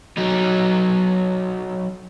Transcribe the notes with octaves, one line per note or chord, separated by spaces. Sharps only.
F#3 D#4